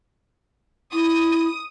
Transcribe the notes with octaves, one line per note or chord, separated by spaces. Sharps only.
E4 D#6